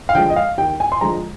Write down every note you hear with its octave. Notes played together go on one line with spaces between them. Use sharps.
F5
D3 F3 G#3 G5
D#5
F5
D#2 G5
G#5
C6
D3 F3 G#3 A#5